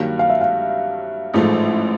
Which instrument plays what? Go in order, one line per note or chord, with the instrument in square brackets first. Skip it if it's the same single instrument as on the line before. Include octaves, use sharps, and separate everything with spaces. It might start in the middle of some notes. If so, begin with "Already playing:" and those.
Already playing: [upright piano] G2 D#3 F#3 A#3 [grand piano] F5
[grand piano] F5
E5
F5
[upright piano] A1 G#2 F3 A3